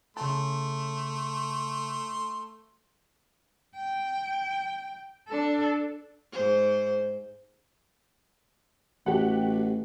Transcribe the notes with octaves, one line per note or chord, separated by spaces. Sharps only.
C#3 A3 A5 C6
G5
D4 A4
G#2 C5
A1 F#4 G4 F#5